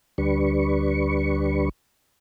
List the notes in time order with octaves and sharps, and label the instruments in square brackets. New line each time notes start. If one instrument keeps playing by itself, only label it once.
[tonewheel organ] D2 G3 D4 B4 C#6